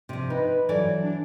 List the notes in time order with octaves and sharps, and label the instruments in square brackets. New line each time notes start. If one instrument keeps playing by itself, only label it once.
[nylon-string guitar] C3 F3
[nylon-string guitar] D#4 [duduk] B4
[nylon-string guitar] E3 A4 D5 [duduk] F#3
[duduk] D4